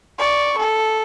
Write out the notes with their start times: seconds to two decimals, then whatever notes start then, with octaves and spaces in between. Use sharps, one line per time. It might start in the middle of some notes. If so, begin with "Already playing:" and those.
0.18 D5 C#6
0.58 A4